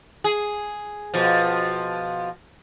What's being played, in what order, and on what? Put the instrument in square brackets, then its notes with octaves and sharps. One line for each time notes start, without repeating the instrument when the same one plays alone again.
[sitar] G#4
B2 F3